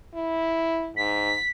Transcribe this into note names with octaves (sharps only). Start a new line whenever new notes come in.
E4
G#2 B6